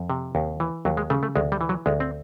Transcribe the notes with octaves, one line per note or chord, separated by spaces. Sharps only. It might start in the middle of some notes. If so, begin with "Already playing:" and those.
Already playing: F2
C3
D#2
E3
D#2 F#3
G#3
C#3 A3
A3
D2 G#3
G3
E3
F#3
D2 G#3
C4